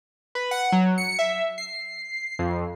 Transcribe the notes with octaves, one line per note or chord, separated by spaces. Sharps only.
B4
F#5
F#3
C#7
E5
C7
F2